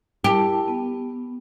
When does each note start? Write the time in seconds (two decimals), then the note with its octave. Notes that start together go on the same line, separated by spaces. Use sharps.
0.24 E4 G4 A#4 A5
0.68 B3